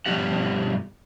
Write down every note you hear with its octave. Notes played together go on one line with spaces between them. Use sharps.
G2 B2 F3 B3 G4 F#5